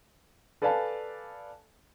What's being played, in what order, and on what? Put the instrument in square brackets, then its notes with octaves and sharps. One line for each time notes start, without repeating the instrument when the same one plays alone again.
[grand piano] A4 B4 D5 F5 G#5 A5